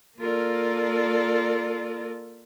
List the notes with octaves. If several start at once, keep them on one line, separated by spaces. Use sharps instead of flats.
A#3 F4 A4 A#4 D5